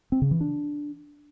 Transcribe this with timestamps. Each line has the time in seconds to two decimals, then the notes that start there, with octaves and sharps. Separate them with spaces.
0.12 C4
0.22 C#3
0.31 E3
0.41 D4